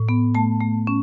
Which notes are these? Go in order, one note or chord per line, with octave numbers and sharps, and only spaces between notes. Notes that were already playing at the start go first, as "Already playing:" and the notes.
Already playing: A2
B3
A3 A5
A3
C#4